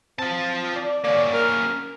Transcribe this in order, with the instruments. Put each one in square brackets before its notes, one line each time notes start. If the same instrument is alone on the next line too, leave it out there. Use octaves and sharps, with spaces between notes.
[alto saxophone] C4 [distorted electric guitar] F4 A5
[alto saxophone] D5
[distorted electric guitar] A#3 C#4 [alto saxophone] D5
[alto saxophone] A#4